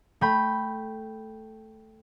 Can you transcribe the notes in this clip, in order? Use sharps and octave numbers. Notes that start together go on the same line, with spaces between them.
A3 G5 B5